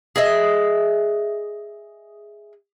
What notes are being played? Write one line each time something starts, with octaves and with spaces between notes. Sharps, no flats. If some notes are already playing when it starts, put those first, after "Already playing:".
G#4 D#5 E5